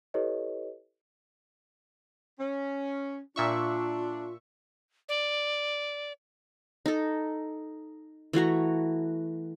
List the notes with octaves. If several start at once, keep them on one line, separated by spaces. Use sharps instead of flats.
E4 G4 A4 B4 C#5 D#5
C#4
A#2 D4 F4 E5 C#6
D5
D#4 A4
E3 A3 F#4 A#5